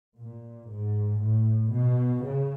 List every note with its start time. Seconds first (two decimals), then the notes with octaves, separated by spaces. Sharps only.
0.18 A#2
0.69 G#2
1.21 A2
1.72 B2
2.23 C#3